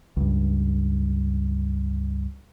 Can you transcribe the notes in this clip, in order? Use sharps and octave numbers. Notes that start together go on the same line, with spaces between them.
C#2 G2